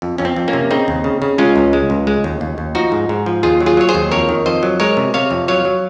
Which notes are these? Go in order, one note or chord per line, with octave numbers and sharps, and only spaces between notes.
F2
F2 C#4
C4
F2
A#3 C#4
C3
C#3 C4 D#4
D#2
C#3
C#3
G#3 C#4 F4
C#2
G#3
C#2
G#3
D#2
D#2
D#2
F3 D#4 F#4
G#2
G#2
F3
D#2 F4 G#4
F#3
F4 G#4
F#3 C#5
G#4 C5
D#2
F2 A#4 C#5
D#3
F2 C5 D#5
F#3
G#3 A#4 C#5
C3
C3 C#5 F5
F2
F#3 C#5 F5
F#3